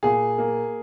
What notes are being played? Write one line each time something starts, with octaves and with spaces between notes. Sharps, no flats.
A#2 G#4
A#3